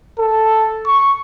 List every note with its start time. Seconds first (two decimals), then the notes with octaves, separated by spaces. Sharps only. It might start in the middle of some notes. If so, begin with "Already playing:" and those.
0.19 A4
0.86 C#6